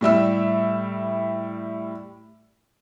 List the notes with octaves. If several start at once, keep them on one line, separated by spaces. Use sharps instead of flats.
A2 G3 E5 E6